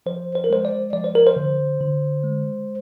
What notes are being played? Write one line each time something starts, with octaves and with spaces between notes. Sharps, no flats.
F3 C5
C5
A#4
G#3 C5
D5
F3 D5
C5
A#4
C5
D3
D3
G#3